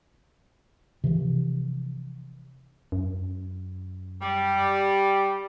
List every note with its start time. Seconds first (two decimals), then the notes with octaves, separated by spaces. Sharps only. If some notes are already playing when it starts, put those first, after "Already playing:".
1.04 C3 E3 F3
2.92 F#2
4.21 G3